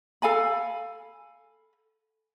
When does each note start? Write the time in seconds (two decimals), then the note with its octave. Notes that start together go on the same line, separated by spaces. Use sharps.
0.22 A4 F5 G#5 B5